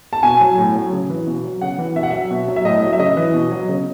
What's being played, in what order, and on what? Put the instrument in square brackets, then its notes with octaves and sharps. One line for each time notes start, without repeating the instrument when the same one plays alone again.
[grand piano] A5
B2 G#5
F#3
A2
F#3
C#3
E3
B2
F#3
C#3 F#5
E3
B2 E5
F#5
F#3 E5
B2
F#3
E5
A2 D#5
F#3
E5
C#3 D#5
E3
B2
F#3
C#3